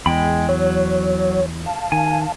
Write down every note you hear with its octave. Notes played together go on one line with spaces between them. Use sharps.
E2 G#3 G5 B5
F#3 C#5
F5 A5
D#3 G#5